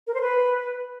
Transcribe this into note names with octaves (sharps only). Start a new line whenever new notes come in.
A#4
C5
B4